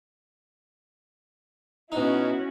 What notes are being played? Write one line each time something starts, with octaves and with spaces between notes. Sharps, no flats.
B2 C#4 D#4 E4 F#4